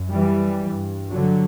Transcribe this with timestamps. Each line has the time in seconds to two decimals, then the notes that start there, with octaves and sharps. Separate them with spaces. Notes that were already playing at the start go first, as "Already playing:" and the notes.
Already playing: F#2
0.11 E3 G3
0.62 G2
1.11 D3 F#3